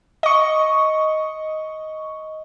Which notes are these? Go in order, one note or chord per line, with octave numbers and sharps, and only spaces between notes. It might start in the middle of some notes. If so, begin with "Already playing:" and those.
D#5 C#6